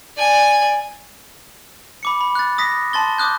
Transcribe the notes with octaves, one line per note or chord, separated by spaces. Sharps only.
D5 G#5
B5 D6 C#7
B5
F#6 A6
D#6 A#6 B6
A5 C6 A6 G7
D6 D#6 F#6 G6